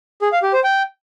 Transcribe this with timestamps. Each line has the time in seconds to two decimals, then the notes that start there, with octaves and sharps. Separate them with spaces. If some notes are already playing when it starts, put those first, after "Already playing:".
0.22 G#4
0.32 F5
0.43 G4
0.53 C5
0.64 G5